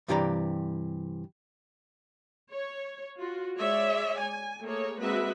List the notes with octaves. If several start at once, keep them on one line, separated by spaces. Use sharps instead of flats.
G2 C3 E3 G4 D5 A#5
C#5
F4 F#4
G#3 C#5 D5 E5
G#5
A3 A#3 G#4 C#5
G#3 A#3 C4 F#4 B4 E5